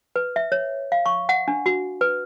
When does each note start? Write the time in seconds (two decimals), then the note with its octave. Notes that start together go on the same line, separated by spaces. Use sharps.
0.16 B4
0.36 E5
0.52 C#5
0.92 F5
1.06 C#6
1.29 F#5
1.48 D4
1.66 F#4
2.01 B4